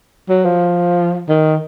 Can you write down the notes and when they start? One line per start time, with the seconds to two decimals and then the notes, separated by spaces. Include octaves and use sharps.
0.29 F#3
0.45 F3
1.28 D#3